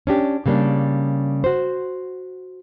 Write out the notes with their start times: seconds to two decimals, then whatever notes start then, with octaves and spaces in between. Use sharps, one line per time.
0.07 C#4 D4 G4
0.46 C#3 G3 A#3 C4 D4
1.44 F#4 C5